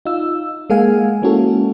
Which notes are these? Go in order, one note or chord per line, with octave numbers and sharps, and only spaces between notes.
D#4 F4 E6
G#3 A#3 G#4 F5 F#5 G#5
G#3 A#3 C#4 E4 F#4 A4